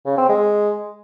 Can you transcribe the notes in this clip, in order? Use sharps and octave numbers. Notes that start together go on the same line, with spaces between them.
C#3
C4
G#3